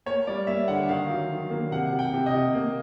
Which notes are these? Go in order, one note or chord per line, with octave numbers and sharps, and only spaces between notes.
A#3 C#5
G3 D5
A#3 E5
D3 F#5
D#3 F5
F#3
D#3
A#3
C3 F#5
C3
G5
C3
D#5
C3
A#3